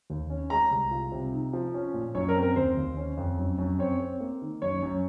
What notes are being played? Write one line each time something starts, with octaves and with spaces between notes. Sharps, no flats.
D#2
C#4
G#3 A#5
C2
F4
C3
D#4
F3
C#4
A#2
F#2 C#5
A#4
C4
A#4
D#2 C5
D#2
C#4
F2
F#2
F#2
C4 C#5
C4
A#3
D#3
F#2 C#5
F#2